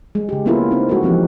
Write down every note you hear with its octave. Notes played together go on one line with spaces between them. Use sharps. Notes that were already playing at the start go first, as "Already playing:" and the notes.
G#3
C#3 G4
A#3 B3 C#4 E4 F4 A#4
C4 D#4
G#3 F#4 A4 A#4
E3 F3 C4 G4